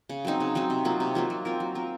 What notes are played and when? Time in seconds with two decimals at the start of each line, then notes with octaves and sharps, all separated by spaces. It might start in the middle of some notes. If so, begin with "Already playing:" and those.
0.09 C#3
0.25 F#3 C4 D#4
0.40 C#3
0.55 F#3 C4 D#4
0.70 C3
0.85 F#3 A#3 F4
1.00 C3
1.15 F#3 A#3 F4
1.30 F#3
1.45 C4 F4 A#4
1.60 F#3
1.75 C4 F4 A#4